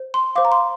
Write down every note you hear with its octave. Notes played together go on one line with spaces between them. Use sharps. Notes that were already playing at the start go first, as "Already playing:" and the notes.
Already playing: C5
C6
C5 F5 D6
A#5
C6